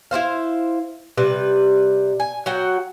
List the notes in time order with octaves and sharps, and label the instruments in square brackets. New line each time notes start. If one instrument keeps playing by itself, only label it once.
[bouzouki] E4 F4 C5 F5
C3 G3 B4
G#5
F#3 F#4 F#5 G5